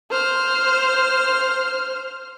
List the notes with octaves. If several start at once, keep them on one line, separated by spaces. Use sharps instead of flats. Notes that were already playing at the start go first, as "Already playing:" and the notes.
C5 F6